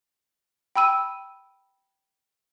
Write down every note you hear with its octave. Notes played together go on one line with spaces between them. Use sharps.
G5 B5 E6 D#7